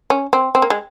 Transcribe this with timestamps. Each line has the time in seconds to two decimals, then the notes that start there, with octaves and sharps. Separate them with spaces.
0.10 C#4
0.33 C4
0.55 C4
0.62 A#3
0.70 G#3